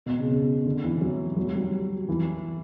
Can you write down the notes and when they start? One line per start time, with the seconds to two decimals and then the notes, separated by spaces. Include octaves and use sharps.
0.06 B2
0.19 C#3
0.31 C#3
0.66 D3
0.84 E3
1.01 F#3
1.36 F#3
1.46 G3
1.55 F#3
2.09 E3